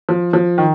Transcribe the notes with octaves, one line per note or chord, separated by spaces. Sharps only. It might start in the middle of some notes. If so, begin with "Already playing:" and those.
F3
F3
D#3